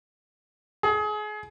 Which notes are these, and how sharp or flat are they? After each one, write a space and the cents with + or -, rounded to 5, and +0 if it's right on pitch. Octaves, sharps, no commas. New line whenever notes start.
G#4 +30